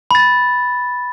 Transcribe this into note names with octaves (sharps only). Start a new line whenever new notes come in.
B5 A6